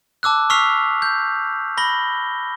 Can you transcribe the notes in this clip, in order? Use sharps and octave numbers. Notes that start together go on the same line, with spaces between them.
A5 D6 E6 F#6
C#6 E6 F6 B6 C7 F7
G6
B5 A#6 G7